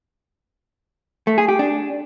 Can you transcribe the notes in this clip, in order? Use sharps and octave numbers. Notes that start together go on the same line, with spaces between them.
A3
G#4
G4
D4